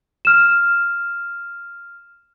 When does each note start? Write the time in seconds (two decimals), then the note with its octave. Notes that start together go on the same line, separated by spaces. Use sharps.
0.25 F6 E7